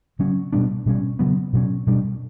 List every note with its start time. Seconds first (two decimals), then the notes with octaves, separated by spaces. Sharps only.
0.19 C#3 F#3 C#4
0.53 B2 G3 B3 D4
0.86 B2 G3 C#4
1.19 C#3 F#3 B3
1.53 B2 F#3 C#4
1.87 B2 G3 D4